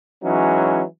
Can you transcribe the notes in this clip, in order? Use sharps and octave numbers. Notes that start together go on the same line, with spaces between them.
E3 F#3 G#3 C#4 D#4